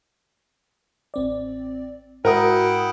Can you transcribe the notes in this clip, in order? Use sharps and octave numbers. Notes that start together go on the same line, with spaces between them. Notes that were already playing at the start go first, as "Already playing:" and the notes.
A1 C4 D5
G#2 E4 F#4 A#4 F#5 G5 D#6